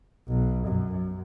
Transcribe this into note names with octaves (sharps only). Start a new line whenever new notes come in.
B1
F#2